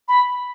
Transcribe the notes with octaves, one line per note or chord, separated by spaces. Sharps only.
B5